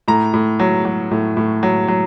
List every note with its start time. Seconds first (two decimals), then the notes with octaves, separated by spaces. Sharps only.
0.08 A2 A#5
0.34 A2
0.60 F#3
0.85 F#3
1.11 A2
1.37 A2
1.63 F#3
1.88 F#3